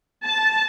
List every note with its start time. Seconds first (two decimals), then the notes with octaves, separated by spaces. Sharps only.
0.25 A5